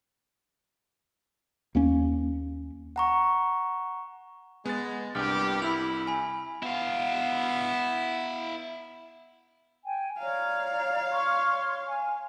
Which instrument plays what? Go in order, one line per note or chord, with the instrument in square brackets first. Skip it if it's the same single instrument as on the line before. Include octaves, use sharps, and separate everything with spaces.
[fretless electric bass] D#2 A#3 C#4
[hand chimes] F#5 A#5 C#6
[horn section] G#3 [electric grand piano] B3 A6
[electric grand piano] C2 [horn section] G2 G4 [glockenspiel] F6
[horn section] E4 [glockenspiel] B5 F7
[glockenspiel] G#5 B5
[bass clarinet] B3 [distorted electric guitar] E4 F5
[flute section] G5 G#5
[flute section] C#5 D5 A#5 [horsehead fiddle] F5
[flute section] C#5 C6 C#6
G#5